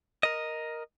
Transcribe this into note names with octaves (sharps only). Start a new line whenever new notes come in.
A#4 D#5